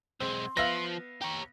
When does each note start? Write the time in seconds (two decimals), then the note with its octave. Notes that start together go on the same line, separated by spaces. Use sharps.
0.20 B1 G#3 C4 C6
0.57 F3 B3 E5 F5 A#6
1.22 G4 C#5 A#5